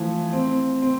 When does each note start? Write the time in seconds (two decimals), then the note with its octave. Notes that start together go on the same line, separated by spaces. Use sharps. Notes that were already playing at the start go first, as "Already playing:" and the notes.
Already playing: E3 F3 A3
0.33 C4
0.82 C4